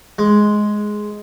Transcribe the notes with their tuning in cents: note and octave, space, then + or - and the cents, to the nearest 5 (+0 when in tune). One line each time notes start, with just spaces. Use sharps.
G#3 +5